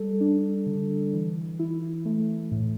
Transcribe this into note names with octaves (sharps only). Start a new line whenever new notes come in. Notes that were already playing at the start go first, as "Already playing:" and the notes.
Already playing: G3 A4
D4
D3
E3
E4
A3
A2